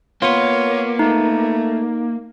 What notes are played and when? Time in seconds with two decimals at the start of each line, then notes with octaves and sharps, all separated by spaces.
0.22 A#3 B3 F4 C#5
0.99 A3 D#4